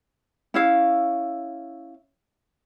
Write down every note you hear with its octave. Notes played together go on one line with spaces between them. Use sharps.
C#4 E4 F5